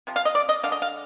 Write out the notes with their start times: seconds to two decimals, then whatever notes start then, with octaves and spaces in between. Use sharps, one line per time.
0.07 C3 F3
0.16 F5
0.25 D#5
0.35 D5
0.49 D#5
0.63 D3 G#3 F5
0.72 D#5
0.82 F5